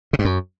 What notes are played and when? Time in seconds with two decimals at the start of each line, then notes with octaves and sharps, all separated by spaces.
0.13 C#3
0.19 G2
0.25 F#2